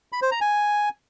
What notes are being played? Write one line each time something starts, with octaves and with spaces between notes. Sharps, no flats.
B5
C5
A#5
G#5